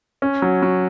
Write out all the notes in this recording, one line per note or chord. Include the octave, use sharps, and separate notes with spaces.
C#4
F#3
F#3